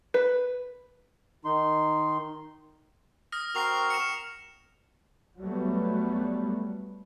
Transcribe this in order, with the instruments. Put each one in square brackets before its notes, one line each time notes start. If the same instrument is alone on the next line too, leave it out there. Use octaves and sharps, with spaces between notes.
[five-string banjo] B4
[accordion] D#3 D#4 C6
[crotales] D#6 F6 A#6
[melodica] C4 F#4 A#4 [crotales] F6 C7 F7
[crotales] C#7 E7
[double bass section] F#3 G3 A3 B3